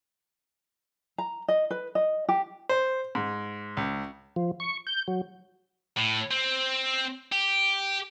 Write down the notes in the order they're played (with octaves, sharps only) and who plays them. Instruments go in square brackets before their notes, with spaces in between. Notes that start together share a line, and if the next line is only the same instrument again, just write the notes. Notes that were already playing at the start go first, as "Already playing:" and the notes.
[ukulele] A#5
D#5
B4
D#5
G4
[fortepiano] C5
G#2
C#2
[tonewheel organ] F3
C#6
G6
F#3
[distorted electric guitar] A2
C4
G4